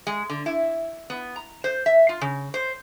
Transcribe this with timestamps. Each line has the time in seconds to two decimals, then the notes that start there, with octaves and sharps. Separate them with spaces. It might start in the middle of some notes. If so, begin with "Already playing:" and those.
0.07 G#3
0.30 D3
0.46 E4
1.10 B3
1.36 A#5
1.64 C5
1.86 E5
2.09 F4
2.21 C#3
2.54 C5